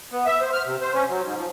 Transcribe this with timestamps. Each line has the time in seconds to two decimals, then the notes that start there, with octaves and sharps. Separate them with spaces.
0.12 B3
0.26 E5
0.40 C5
0.53 F6
0.65 C3
0.81 C5
0.94 C#4
1.08 F#3
1.24 G#2
1.37 F3